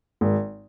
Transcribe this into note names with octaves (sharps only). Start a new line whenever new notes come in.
G#1